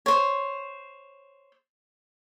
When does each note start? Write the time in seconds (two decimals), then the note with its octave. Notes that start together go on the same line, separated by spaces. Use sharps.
0.06 C5 C#5